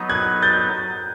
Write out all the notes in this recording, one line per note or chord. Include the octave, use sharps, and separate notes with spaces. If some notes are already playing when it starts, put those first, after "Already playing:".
Already playing: F#3 B3 D#4
F#6 G#6
G6 A6